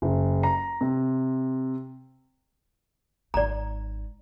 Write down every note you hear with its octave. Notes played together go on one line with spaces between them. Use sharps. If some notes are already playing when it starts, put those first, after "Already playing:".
F#1
A#5
C3
G#1 D#4 D5 A#5